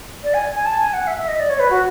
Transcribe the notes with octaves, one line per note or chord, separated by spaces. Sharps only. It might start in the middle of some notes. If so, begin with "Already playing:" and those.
D5
G#5
G#5
A5
G#5
F#5
E5
E5
D#5
D5
C#5
B4
F#4